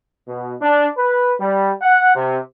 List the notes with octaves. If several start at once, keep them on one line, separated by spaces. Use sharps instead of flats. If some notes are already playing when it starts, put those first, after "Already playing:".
B2
D4
B4
G3
F#5
C3